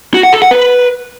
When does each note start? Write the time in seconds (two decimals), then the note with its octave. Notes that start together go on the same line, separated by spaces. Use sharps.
0.14 F#4
0.23 F#5
0.33 A4
0.42 F#5
0.51 B4